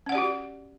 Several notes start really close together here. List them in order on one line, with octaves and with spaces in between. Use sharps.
C#4 F#5 D5 G4 F#4